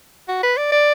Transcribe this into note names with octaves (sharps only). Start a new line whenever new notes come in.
F#4
B4
D5
D5